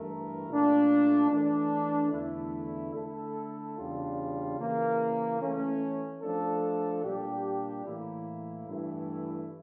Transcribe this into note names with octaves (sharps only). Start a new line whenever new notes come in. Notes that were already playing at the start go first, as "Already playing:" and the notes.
Already playing: G2 E3 A3 E4 A#4
A#2 A3 D4
E3 A3 D4
E2 D3 A3 E4
D3 A3 E4 A4
E2 C#3 G3 D4 F4
C#3 E3 A#3
E3 A3 C#4
F3 A3 D4 A4
A#2 G3 D4 G4
A2 E3 A#3 E4
G2 E3 A3 E4